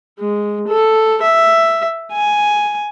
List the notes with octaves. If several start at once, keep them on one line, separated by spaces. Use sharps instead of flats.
G#3
A4
E5
G#5